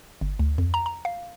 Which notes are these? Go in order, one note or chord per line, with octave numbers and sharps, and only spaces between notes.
G1
D2
F2
A#5
A#5
F5